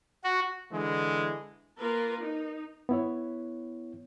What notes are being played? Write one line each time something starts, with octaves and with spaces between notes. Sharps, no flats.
F#4
D3 E3 G#3
A#3 F4 A#4 B4
D#4
B3 E4 C#5